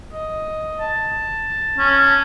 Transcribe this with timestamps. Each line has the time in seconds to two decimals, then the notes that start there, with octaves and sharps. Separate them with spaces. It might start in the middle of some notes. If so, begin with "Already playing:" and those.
0.12 D#5
0.79 A5
1.77 C#4